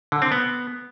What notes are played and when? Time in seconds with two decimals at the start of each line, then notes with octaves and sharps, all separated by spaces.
0.12 D3
0.22 C4
0.32 B3